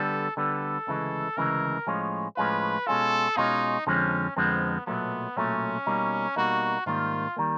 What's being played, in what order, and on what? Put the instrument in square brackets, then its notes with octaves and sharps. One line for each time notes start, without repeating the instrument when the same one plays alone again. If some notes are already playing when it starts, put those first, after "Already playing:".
Already playing: [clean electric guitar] D3 G3 B3 [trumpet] A4
[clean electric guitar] D3 G3 B3 [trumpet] A4
[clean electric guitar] D2 C#3 E3 G#3
[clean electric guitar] D2 C#3 E3 G#3 [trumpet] A#4
[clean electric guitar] A2 F3 G#3 C#4 F4
[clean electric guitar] A2 F3 G#3 C#4 F4 [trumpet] B4
[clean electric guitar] B2 G#3 C#4 F4 [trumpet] A4
[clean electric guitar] B2 G#3 C#4 F4 [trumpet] D#4
[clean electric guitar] F2 D3 F3 G#3 C4 [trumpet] C#4
[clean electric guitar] F2 D3 F3 G#3 C4 [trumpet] B3
[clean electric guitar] B1 A#2 F#3 A3 [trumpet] B3
[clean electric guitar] B1 A#2 F#3 A3 [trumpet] C#4
[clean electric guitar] B2 G3 A#3 D#4
[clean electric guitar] B2 G3 A#3 D#4 [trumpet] F#4
[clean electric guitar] G#2 D#3 G3 A#3 [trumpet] F4
[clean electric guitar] D#3 G3 A#3